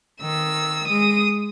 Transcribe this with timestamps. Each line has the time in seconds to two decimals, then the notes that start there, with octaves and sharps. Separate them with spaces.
0.21 D#3 E6
0.88 G#3 D#6